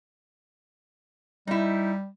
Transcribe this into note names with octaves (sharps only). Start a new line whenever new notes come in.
G3 D#4 E4